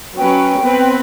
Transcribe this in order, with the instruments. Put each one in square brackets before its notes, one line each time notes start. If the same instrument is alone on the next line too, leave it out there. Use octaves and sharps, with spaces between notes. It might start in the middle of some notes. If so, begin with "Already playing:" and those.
[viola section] F#3 C#4 B4 [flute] G5
[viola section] B3 C4 B4